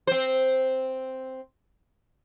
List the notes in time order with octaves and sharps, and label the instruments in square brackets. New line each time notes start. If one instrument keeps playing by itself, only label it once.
[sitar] C4 C5